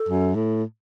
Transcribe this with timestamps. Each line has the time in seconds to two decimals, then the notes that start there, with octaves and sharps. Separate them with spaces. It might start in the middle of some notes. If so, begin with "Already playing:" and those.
Already playing: A4
0.09 F#2
0.35 A2